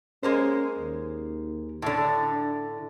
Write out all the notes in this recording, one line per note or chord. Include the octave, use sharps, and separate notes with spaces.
G#3 A#3 C#4 C5
D#2
A2 D3
D4